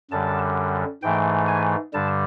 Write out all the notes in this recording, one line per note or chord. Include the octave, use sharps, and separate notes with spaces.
F#2 D3 G3 A5
G#2 E3 A3 G5
G#5
G2 D3 G3 A5